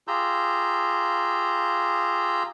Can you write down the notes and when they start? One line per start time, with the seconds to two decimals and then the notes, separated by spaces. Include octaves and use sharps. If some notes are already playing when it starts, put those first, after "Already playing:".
0.08 F4 G4 G#4 A#5 E6 G6